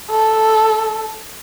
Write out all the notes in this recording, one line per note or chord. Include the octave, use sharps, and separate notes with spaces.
A4